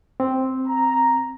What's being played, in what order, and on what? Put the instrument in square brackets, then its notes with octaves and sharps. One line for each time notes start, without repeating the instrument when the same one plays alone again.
[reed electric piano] C4
[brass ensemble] A#5